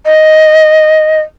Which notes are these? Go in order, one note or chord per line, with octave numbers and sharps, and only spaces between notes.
D#5